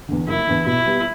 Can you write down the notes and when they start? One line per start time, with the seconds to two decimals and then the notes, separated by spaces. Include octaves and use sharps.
0.09 E2 D3
0.27 F#1 E4
0.47 E2 D3
0.66 B2 E4
0.86 G3 B3